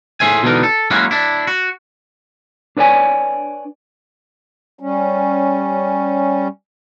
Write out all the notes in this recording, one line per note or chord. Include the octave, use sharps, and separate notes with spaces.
A2 G#4 C5 E5 G#5
B2 D3 E3 B3 D#4 A#4
A4
F#3 G#3 A#3 C#4 E4 F#4
D4 E4
F#4
D4 B4 C#5 D5 G#5
G3 C#4